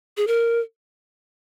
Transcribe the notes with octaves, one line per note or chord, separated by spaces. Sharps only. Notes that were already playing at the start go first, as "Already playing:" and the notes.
G#4
A#4